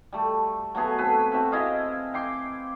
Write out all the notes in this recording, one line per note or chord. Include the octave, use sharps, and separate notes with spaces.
G3 A3
F#3 A3 B3 G#4
C4 A4 B4
C4 F#4 E5
E4 G#4 D#5 F5
G5 C6 D6